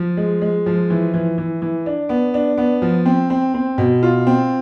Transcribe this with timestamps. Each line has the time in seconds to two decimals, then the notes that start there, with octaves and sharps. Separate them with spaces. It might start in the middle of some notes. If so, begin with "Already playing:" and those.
Already playing: F3
0.17 G#3
0.41 G#3
0.66 F3
0.90 E3
1.14 E3
1.38 E3
1.62 E3
1.86 D4
2.09 B3
2.34 D4
2.58 B3
2.82 F3
3.06 C4
3.30 C4
3.54 C4
3.78 B2
4.03 F4
4.27 C4